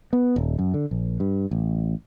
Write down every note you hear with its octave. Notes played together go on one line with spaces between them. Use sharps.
B3
D#1
F#2
D3
A#1
G2
A1